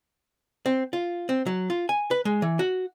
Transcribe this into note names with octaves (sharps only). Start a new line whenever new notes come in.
C4
F4
C4
F#3
F4
G#5
B4
G#3
E3
F#4